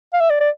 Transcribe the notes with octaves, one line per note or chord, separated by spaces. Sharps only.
F5
E5
D5
D5